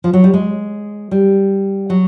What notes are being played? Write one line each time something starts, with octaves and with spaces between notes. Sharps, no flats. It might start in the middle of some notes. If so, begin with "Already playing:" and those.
F3
F#3
G3
G#3
G3
F#3